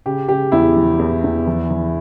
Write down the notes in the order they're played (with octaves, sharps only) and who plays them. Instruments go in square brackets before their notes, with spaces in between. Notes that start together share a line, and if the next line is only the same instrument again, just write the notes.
[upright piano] C#3 G4
C#3 G4
E2 E4
E3
E2
E2
E3
E3